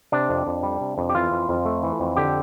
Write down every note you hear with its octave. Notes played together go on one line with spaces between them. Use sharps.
C3 D4
F2
F2
G3
C3
F2
G4
E3 F4
F2
F2
A3
E3
F2
D3 G4